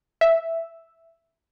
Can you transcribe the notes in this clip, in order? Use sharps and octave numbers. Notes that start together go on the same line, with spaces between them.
E5